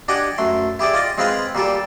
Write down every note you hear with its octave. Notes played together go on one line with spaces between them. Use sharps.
D4 G4 D#5 F#5 G#5
F#2 A3 C6
E4 G4 G#4 D5
F4 D5 D#5
G#3 C4 F4 G#4 B4 F5
A#2 G3 G4 A4